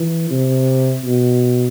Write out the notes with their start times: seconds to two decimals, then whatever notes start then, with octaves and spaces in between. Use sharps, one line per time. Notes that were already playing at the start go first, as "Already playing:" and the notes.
Already playing: E3
0.31 C3
1.05 B2